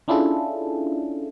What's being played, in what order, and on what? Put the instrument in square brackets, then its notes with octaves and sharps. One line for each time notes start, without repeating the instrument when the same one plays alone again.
[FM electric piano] C#4 D4 E4 F4 G#4 A4